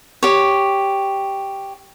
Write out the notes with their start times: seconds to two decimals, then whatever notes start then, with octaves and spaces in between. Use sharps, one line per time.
0.23 G4 C#5